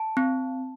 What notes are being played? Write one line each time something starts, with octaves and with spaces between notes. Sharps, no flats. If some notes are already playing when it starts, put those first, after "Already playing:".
Already playing: A5
C4